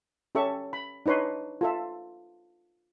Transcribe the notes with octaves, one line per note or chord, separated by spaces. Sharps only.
C#4 G4 A4 E5 C#6
B5
D4 D#4 B4 C#5 C6
F4 A4 E5